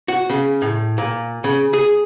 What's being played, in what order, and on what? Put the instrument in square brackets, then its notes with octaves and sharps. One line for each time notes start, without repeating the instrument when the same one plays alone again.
[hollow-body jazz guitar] F#4
C#3
A2
A#2
C#3
G#4